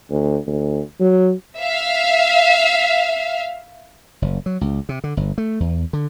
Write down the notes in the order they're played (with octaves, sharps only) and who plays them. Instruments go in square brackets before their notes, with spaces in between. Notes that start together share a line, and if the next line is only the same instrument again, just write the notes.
[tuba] D2
D2
F#3
[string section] E5 F5
[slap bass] F#1
F#3
C#2
C3
D3
G1
A3
E2
D3